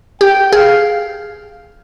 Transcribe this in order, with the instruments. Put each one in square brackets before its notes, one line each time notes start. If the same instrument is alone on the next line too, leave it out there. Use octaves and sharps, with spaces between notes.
[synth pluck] G4 [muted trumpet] G5
[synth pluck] G#4 [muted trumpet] F5